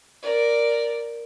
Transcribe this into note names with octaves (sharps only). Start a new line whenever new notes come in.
A#4 D5